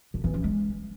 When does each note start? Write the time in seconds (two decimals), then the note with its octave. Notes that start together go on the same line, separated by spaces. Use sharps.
0.14 D3
0.24 E3
0.34 C#4
0.44 G#3